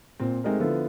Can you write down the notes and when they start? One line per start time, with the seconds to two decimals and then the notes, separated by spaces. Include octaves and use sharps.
0.20 A#2 C4
0.44 G#3 A3 C4 D#4 G4 A#4
0.60 D3 F3 B3 E4 F4 A4